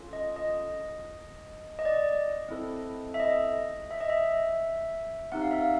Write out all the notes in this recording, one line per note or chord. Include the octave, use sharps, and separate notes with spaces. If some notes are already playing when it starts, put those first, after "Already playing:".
Already playing: C#4 F4 A4
D#5
D#5
D#5
D5
D#5
C4 E4 A4
E5
D#5
E5
D#5
E5
C4 D#4 G4 F#5
F5
E5
F5